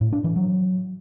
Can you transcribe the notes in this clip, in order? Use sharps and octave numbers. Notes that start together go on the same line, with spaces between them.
A2
D4
E3
F#3